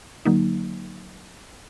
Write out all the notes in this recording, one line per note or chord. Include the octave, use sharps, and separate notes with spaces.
D3 F#3 A#3 D#4